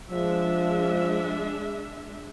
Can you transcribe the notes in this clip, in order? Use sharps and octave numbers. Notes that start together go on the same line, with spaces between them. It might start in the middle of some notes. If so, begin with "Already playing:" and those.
F3 G#3 D4 E5